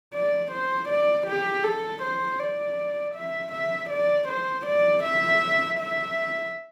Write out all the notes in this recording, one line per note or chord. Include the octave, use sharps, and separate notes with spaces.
D5
C5
D5
G4
A4
C5
D5
E5
E5
D5
C5
D5
E5
E5